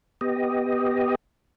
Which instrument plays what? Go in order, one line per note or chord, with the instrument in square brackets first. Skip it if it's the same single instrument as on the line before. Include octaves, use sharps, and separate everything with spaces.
[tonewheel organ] B3 G4 D#5